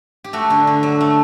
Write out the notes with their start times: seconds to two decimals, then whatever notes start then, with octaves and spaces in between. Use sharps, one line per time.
0.24 G4
0.33 A3 F#4
0.50 D3
0.67 D3
0.83 F#3
1.01 A3